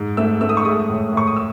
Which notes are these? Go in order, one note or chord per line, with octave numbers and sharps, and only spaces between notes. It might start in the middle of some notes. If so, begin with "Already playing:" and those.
Already playing: G#2
A3 E6
A3 E6
D#6
C#6
G#3 D#6
A2
A2 C#6
D#6
E6